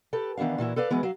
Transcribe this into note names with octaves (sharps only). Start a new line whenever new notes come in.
G4 A4 B4
D#3 E3 B3 D4 F5
A#2 E3 E4 F#4
A4 B4 D5 F5
E3 F#3 G#3 B3
F#3 F5